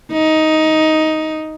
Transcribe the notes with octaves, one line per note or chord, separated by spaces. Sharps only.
D#4